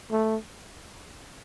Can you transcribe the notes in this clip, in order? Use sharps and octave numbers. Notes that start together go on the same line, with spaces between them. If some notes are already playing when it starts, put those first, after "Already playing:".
A3